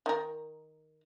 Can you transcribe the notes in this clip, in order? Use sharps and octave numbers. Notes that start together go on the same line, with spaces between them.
D#3 A#4